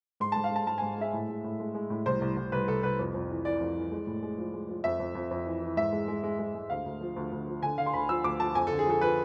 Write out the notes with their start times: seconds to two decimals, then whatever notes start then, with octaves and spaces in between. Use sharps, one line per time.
0.20 G#2 C6
0.32 G#2 A5
0.44 F5
0.51 G#2 A5
0.67 G#2 A5
0.78 G#2 G#5
0.98 G#3 E5
1.13 A2
1.29 G#3
1.44 A2
1.60 G#3
1.75 G#3
1.90 A2
2.06 C2 C5
2.22 C2
2.37 C2
2.52 C2 B4
2.68 C2 A4
2.83 C2 B4
2.99 F2
3.14 F2
3.30 E3
3.45 E3 D5
3.60 F2
3.76 E3
3.92 G#3
4.07 A2
4.23 G#3
4.38 F3
4.53 G#3
4.69 F3
4.84 F2 E5
5.00 F2
5.15 F2
5.31 F2
5.46 E3
5.62 E3
5.77 G#2 E5
5.93 G#3
6.08 G#3
6.24 G#3
6.39 G#3
6.55 G#3
6.70 D2 F5
6.86 D2
7.01 F3
7.16 D2
7.32 D2
7.47 F3
7.62 D3 G#5
7.78 D3 F5
7.86 C6
7.93 D2 B5
8.09 F3 E6
8.24 D2 D6
8.40 F3 A5
8.55 F2 G#5
8.67 D3 A4
8.79 G#4
8.86 F3 A4
9.01 F3 B4